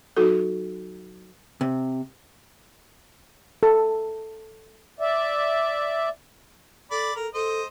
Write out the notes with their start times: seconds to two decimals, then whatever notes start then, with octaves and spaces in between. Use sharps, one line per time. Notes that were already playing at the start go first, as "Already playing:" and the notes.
0.17 F#3 D#4 F#4 A4
1.61 C3
3.63 A4
5.00 D5 E5
6.91 A4 D5 B5
7.16 A4 A#4
7.34 A4 C5 D#5